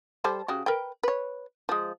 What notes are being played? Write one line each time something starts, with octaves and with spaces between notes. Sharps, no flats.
G3 A4 C5
C#3 F#4 G4
A#4 B4 G5
B4 C#5
F3 G#3